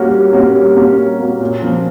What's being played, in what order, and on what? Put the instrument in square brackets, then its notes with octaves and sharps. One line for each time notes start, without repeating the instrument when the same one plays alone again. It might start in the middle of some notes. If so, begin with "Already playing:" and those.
Already playing: [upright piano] G3 A#3 C#4 F#4
G3
A#3 C#4 F#4
G3
A#3 C#4 F#4
G3
A#3 C#4 F#4
A#2
F3 A#3 C#4